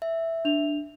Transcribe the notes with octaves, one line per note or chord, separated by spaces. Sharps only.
E5
D4 F7